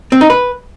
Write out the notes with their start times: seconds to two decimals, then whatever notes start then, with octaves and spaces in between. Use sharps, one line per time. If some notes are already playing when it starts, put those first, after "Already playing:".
0.12 C4
0.21 D#4
0.30 B4